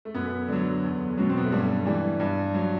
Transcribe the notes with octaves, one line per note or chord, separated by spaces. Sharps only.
A3
F#2 B3
D3 F#3
E2
B2 F#3
C4
B3
A3
G2 G3
E3 G3
G2
F#3